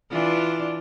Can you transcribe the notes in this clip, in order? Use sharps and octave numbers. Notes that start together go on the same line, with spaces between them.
E3 D4 F4